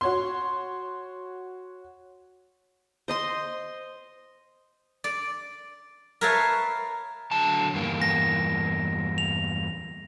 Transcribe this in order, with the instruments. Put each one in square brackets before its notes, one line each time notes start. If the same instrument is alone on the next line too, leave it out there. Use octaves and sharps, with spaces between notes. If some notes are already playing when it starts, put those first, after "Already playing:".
[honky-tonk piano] F#4 C#5 C6
[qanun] C5 D#5 C6
[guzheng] D5
A#4 B4 C#5 E5 F5 A5
[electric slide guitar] D3 F#3 A5
E2 G2 A#3
[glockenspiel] A#6
F7